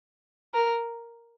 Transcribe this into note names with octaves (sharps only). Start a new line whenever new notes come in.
A#4